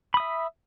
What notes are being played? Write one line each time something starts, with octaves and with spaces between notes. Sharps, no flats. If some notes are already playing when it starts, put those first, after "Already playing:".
E5 B5 D#6